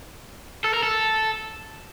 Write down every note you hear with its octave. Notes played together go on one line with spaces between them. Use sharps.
A4
A#4
A4